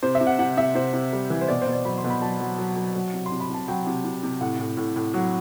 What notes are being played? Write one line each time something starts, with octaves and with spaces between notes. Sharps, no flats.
C3 C5
E5
C3
F#5
C3 F#5
C3 E5
C3 C5
C3
G3
E3
C5
B2 D5
C5
B2
D5
F#3 B5
C6
B2
B5
F#3 A5
F#3
F#3
F#3
F#3
C3
C6
C3
B5
C3 A5
F#3 G5
C3
C3
C3
A2 F#5
A2
A2
A2
F#3